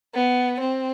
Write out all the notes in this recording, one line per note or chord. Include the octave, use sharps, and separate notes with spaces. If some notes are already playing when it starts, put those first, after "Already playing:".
B3
C4